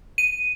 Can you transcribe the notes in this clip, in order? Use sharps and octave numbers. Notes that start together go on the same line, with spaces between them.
D#7